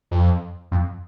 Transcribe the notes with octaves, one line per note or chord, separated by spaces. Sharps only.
F2
F2